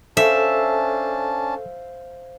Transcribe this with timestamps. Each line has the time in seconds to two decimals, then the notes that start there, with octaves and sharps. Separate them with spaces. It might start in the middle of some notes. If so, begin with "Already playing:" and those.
0.17 C#4 D4 A4 C5 E5 F5 A5